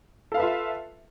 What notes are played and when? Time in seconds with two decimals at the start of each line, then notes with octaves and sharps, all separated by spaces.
0.32 A4
0.34 F5
0.37 B4
0.40 E5
0.43 F4